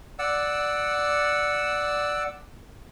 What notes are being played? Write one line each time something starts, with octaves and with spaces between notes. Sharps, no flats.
D5 F#5 E6